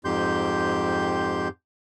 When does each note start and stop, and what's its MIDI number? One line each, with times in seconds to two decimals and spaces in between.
0.05 1.48 41
0.05 1.48 44
0.05 1.48 67
0.05 1.48 84
0.05 1.48 91